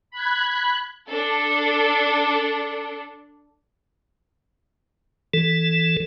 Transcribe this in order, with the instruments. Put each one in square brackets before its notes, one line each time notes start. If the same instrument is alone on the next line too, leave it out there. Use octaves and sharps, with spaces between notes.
[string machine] B5 F#6 G#6
[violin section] D4 A4
[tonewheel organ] E3 A4